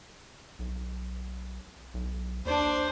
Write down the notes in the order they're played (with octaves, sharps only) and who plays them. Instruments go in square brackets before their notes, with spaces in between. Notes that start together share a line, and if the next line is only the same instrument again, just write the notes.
[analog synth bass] B1
B1
[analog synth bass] D#2 [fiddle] D4 C5